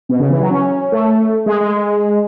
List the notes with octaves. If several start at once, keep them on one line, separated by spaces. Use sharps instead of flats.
B2
C#3
E3
F#3
C#4
A3
G#3
G#3